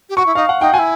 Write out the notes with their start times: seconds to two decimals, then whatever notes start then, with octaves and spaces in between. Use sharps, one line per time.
0.09 G4
0.17 F#4 C#6
0.26 E4
0.35 D#4 F5
0.49 F#5
0.60 D#4 G5
0.74 F#4 G#5
0.79 E4